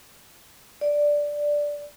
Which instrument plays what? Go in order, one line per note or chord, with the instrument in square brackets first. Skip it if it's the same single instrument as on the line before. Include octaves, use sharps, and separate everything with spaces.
[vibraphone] D5